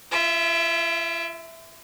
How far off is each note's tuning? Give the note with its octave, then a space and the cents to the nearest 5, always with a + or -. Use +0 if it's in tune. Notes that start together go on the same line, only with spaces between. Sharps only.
F4 -45 E5 +0